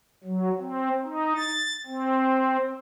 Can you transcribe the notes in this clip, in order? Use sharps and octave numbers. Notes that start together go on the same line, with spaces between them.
F#3
C4
D#4
A6
C4